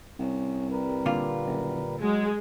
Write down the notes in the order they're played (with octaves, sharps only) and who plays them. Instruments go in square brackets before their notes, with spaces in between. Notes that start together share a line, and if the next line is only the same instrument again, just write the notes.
[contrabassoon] C2 [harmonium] C#4
[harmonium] G3 A#4 B4
[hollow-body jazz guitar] A#2 D3 F4
[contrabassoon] F#1
[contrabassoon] F#3 [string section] G#3